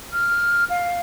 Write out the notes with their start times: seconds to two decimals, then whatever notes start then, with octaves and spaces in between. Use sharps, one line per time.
0.13 F6
0.70 F5